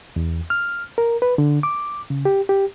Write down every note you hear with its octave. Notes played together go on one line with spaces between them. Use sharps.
E2
F6
A#4
B4
D3
D6
C#3
G4
G4